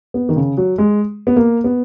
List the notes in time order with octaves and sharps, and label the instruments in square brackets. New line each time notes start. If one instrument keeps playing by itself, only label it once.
[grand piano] B3
D#3
C#3
F#3
G#3
B3
A#3
B3